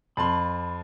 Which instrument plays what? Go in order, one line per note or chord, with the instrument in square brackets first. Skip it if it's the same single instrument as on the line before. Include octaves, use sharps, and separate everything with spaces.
[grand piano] F2 A5 C6 [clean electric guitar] B5